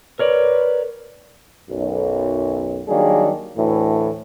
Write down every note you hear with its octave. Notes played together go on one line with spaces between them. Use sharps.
A#4 B4 C#5 D5
B1 F#2
D#3 F#3 G3 A#3 D4 G#4
D2 A2 E3